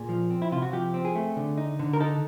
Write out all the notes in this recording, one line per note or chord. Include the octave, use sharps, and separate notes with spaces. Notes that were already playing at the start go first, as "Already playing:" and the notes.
Already playing: A#2 G#4
F3
C4
E4
C3 F4
F#4
F3 G4
C4
G#4
A3
D3
D#4
D3
A#4
D#4 A4